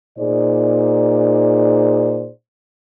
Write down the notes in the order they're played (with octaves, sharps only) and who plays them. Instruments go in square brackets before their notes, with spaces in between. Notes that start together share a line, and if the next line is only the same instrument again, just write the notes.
[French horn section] A#2 D#4 G#4 C5 D5